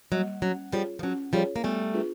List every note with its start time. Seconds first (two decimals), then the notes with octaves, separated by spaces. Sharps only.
0.12 F#3 G3 A#3
0.42 F#3 C#4
0.72 F3 G3 F4 G#4 C#5
0.99 F3
1.03 F#3 C#4
1.33 F3 G3 F4 G#4 C#5
1.56 A#3
1.64 G3 A3 B3
1.94 D4 F4 G#4 B4